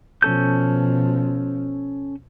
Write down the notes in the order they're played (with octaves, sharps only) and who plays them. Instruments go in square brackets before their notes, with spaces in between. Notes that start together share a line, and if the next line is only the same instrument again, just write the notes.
[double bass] B2 F3 [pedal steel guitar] C#4 A4 G6